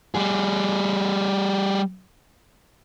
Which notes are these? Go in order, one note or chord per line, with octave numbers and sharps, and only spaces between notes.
G3 G#4